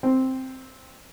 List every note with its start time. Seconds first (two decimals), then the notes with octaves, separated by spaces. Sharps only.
0.03 C4